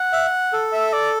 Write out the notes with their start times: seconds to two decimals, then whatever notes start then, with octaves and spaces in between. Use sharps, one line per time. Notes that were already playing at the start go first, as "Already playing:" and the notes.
Already playing: F#5
0.13 E5
0.53 A4
0.72 E5
0.93 D5